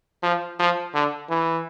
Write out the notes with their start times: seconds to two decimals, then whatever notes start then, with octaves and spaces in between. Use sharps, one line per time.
0.23 F3
0.59 F3
0.94 D3
1.30 E3